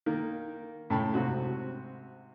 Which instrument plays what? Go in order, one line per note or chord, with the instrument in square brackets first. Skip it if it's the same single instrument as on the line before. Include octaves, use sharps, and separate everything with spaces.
[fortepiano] D#3 A#3 A#4
A2 C#3 G5 A5 B5
G#2 C3 F#4